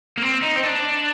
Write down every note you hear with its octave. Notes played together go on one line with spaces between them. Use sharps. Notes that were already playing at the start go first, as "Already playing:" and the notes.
A#3
C4
D#4
C4
D4